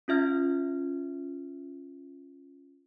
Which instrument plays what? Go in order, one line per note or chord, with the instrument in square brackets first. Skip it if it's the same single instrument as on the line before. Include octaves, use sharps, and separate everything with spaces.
[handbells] C#4 F4 E5 F6 G#6